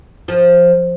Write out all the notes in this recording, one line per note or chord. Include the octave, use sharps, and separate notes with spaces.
F3